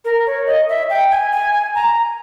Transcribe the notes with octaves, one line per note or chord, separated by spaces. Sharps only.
A#4
C#5
D#5
E5
G5
G#5
G#5
G#5
A#5